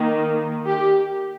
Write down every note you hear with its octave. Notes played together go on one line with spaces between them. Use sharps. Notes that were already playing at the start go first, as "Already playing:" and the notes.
Already playing: D#3 A#3
G4